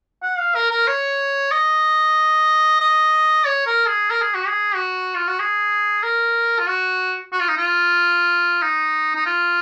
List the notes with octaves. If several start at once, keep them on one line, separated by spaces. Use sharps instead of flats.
F#5
F5
A#4
A#4
C#5
D#5
D#5
C#5
A#4
G#4
A#4
G#4
F#4
G#4
F#4
F4
F#4
G#4
A#4
F4
F#4
F#4
F4
D#4
F4
D#4
D#4
F4